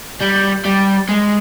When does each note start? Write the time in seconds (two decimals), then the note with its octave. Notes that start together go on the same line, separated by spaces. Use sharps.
0.21 G3
0.65 G3
1.09 G#3